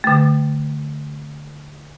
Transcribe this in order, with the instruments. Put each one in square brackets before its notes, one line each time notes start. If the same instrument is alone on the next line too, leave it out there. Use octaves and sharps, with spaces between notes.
[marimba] D3 A3